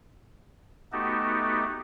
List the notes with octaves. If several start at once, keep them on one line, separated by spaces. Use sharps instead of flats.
A3 B3 D#4 F#4 G4 A4